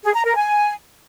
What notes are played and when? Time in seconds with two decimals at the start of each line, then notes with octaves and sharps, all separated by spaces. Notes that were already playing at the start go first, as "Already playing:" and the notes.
0.04 G#4
0.15 A#5
0.25 A#4
0.36 G#5